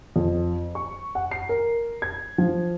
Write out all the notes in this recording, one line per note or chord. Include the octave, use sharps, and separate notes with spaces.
F2
C#6
F#5
C7
A#4
G#6
F3